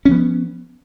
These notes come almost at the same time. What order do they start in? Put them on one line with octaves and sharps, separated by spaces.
C#4 F3 B3